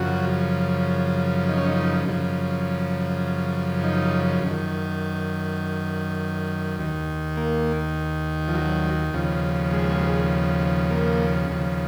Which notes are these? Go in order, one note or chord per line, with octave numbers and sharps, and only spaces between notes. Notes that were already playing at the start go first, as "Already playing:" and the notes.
Already playing: F#2 C#3 F3 F#4
D#4
C#4
D#4
F#2 C#3 F3
D#4
F#2 D#3
D#2 D#3
A#3
F3
F#3
D#2 C#3 F3
G#3
A#3
D#2 C#3 F3